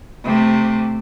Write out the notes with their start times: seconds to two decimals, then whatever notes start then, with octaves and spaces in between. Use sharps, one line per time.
0.24 C3 A3